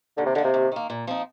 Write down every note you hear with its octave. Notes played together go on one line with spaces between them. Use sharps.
D#2 D3
C3
D3 D#3 A#3
C3
D#2
D#3 A#3
A#2
F3 C4 D#4